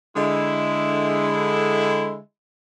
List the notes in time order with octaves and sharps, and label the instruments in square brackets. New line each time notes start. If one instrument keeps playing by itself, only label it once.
[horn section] D3 G#3 E4